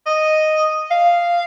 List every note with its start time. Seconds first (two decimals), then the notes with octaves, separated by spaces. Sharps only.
0.06 D#5
0.91 F5